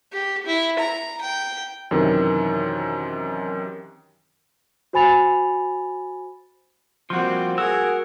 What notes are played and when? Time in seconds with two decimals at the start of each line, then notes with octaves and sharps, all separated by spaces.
0.13 G4
0.46 E4
0.79 A#5
1.21 G5
1.91 F#2 C3 D#3 E3
4.93 F#4 C5 G#5 B5 A6 F7
7.10 F3 G3 A#3 C4 F#4 C5 C6
7.58 F#4 G#4 A#4 E6